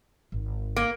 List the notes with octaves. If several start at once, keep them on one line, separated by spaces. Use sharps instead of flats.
G#1
A#3